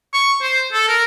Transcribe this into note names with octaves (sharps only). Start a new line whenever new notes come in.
C#6
C5
A4
A#4